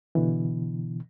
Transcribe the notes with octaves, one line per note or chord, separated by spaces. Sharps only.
B2 D3 E3